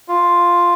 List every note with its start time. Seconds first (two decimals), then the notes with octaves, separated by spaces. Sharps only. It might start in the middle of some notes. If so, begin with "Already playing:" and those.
0.08 F4